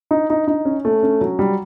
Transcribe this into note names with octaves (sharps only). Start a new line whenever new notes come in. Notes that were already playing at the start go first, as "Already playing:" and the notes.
D#4
D#4
D#4
C#4
A3
C#4
F#3
G3